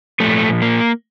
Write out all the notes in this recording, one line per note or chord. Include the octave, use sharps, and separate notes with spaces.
A#2 F3 A3
A#3